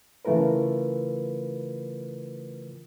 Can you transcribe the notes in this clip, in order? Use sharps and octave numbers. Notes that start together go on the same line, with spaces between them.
C#3 E3 A3 F4 A#4 B4